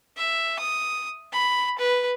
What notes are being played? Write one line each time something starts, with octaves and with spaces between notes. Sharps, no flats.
E5
D#6
B5
B4